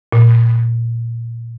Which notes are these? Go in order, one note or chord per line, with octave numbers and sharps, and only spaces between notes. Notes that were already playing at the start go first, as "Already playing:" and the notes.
A#2